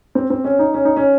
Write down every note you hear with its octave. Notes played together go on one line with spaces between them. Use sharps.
C4
C4
C#4
D#4
C#4
D#4
C#4